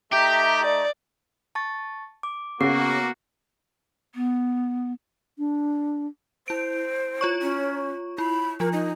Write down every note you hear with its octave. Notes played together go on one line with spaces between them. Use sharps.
A3 D#4 G4 E5 A#5 G6
D5
A5 C#6 A6
D6
C#3 A#3 B3 F#4 D6 C7
B3
D4
E4 C5 D7
F4 C#5 C#6
C#4
E4 B5
F3 F4 A#4
D#4